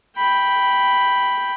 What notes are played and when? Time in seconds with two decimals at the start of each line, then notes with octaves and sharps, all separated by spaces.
0.17 G5 B5